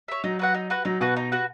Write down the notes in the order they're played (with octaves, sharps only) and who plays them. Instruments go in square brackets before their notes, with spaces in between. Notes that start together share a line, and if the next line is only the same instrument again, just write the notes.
[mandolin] C#5 E5
[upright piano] F#3 [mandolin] D#4
[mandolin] F#4 B4 F#5
D#4
F#4 B4 F#5
[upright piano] F#3 [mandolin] D#4
[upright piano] B2 [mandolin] F#4 B4 F#5
[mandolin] D#4
F#4 B4 F#5